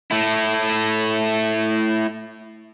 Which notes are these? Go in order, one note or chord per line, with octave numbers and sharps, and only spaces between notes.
A3 E4